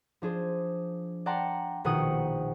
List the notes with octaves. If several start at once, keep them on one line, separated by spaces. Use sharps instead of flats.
F3 D4 G#4 C5
D5 F#5 G5 A5 A#5 C6
A#1 B2 D#3 F#5 G5 D#6